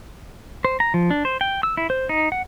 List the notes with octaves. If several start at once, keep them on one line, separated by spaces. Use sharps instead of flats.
C5
A#5
F3
D4
C5
G5
E6
E4
C5
D#4
F#5